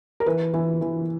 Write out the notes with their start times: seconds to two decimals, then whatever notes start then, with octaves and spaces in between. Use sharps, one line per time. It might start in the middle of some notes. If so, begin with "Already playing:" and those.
0.20 A#4
0.26 E3 B4
0.54 E3
0.81 E3